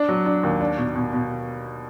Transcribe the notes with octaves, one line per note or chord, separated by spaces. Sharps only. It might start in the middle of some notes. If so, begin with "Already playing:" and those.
Already playing: D4
F#3
D4
D#2
D4
B2
B2
B2